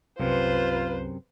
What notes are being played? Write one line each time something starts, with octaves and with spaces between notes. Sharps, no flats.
C2 F#2 C3 F4 B4 C5